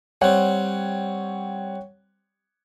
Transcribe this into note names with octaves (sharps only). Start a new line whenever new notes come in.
G3 C4 C#5 F#5 G5